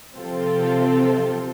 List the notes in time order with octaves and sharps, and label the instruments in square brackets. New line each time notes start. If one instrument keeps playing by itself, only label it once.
[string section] C3 F3 C4 F4 A4